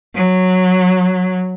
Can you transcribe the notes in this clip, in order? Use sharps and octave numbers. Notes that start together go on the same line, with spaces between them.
F#3